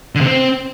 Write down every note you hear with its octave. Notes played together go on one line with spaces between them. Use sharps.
D3
C3
C4